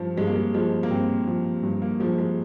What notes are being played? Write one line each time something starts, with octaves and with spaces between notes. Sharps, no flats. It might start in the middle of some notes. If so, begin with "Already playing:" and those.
Already playing: G2 F3
G2 G#3
A#3
G#3
F3 G#3
A#3
G2 C4
F3
G2
A#3
F3 G#3
G#3